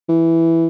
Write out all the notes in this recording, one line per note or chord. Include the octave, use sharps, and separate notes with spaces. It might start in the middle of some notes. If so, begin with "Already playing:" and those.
E3